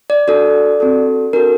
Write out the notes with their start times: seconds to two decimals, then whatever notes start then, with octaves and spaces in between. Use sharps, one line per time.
0.10 D5
0.28 D4 F#4 A4 D5
0.80 C4 F#4 A4
1.33 D4 F#4 A4 A#4